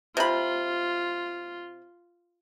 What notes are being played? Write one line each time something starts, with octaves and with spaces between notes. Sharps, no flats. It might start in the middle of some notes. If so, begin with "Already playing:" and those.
C3 F4 B5